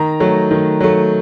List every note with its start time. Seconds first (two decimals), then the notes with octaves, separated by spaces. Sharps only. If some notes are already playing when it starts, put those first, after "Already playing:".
Already playing: D#3 A#5
0.20 F#3 A3
0.51 D#3
0.80 F#3 A3